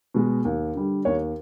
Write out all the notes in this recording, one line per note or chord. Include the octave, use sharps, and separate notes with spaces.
B2 G#3
D#2
D3 G3
D#2 C#5